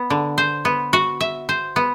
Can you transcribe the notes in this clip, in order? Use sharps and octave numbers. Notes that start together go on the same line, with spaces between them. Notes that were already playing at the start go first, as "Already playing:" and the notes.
Already playing: B3
D3
C5
B3
F#4
E5
C5
B3